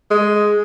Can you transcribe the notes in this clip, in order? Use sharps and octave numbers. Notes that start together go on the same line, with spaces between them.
G#3